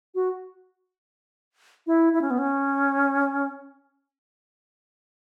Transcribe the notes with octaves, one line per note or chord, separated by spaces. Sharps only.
F#4
E4
E4
C#4
B3
C#4